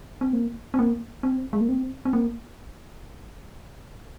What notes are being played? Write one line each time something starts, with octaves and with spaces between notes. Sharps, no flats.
C4
A#3
C4
A#3
C4
G#3
A#3
C4
C4
A#3